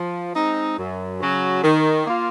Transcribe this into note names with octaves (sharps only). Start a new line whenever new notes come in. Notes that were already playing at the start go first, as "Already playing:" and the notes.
Already playing: F3
G#3 C4 D#4
F#2
C#3 F#3 C#4 F#4
D#3
A#3 F4